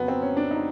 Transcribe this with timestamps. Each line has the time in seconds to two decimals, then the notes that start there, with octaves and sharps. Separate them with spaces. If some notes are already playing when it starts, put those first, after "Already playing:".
Already playing: F2 C#3 F#3 B3
0.08 C4
0.22 C#4
0.37 D4
0.51 D#4